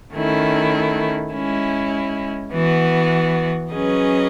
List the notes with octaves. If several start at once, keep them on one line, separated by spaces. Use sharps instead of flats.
D#3 A3 C#4 E4
G#3 C#4 E4
E3 B3 F#4
F#3 C#4 G#4 B4 D#5